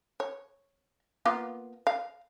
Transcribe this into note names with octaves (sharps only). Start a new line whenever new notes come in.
C#5
A#3 B3 F4
F5